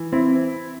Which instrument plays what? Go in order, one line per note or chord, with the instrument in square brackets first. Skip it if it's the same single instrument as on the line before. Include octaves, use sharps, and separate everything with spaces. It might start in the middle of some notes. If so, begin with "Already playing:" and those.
Already playing: [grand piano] E3
[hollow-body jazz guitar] C4 [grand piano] E4